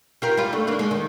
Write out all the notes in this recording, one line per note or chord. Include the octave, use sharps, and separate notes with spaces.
F4 G4 A#4
G3 F4
A3 D4
D#2 A#3 D4
G#3
D#3